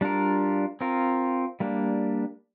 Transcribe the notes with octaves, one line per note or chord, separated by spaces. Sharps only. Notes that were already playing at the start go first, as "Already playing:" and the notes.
G3 D4 F4 A#4
C4 F4 A#4
G3 A#3 D4